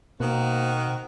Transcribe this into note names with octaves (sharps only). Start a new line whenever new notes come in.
B2 D#3 A#3 C4 F#4